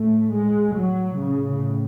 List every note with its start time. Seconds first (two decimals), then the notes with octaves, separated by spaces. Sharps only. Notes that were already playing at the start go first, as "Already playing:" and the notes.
Already playing: A2 A3
0.33 G#3
0.75 F#3
1.18 A2 C#3